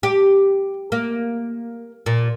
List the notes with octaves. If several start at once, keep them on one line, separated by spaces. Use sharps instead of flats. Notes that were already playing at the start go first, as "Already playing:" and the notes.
G4
A#3
A#2